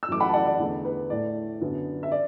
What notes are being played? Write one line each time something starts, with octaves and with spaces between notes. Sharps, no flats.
E6
F#2 E3 A3 D6
F#5 B5
A5
D5 F#5
D5
E2 D3 A3
B4
A2 A3 D5
F#2 D3 F#3 B3
E5
D5